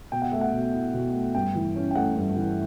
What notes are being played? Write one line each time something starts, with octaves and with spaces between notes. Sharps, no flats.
B2 G5
F#5
A3 E5
F#5
B2
E4
B2
A3
G2 G5
E3
C#4
G5
A3 F#5
G2
E3